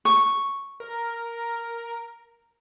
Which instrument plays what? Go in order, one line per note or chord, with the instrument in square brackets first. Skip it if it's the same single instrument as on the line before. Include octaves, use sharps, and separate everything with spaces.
[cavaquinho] C#6
[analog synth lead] A#4